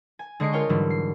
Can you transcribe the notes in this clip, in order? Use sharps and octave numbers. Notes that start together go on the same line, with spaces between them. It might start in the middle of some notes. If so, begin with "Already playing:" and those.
G#5
D3 G#3 D#5 C#6 C7 D7
F4 A#4 C#5 G5
G#2 D3 E3 F#3 G3
C7